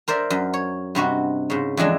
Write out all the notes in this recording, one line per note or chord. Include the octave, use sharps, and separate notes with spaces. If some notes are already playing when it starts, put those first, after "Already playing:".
A#4 C5 D5 E5
F#2
C#5
G2 C3 F#4 D#5
G#2 C#3
F2 E3 G#3 D4